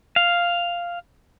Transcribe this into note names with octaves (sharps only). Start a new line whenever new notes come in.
F5